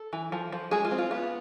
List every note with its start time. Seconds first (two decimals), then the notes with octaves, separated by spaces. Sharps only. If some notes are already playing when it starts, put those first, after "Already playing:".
Already playing: A4
0.13 E3
0.32 F3
0.52 F3
0.71 G#3 G#4
0.85 F4
0.91 C4
0.98 F4
1.11 B3 F4